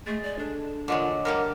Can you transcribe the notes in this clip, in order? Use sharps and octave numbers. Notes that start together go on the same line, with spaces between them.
G#3 A3 A6
D5
D4 A4
A#2 D3 F#3 G#3 C#5 D#5 D6
D3 G3 A#3 A#4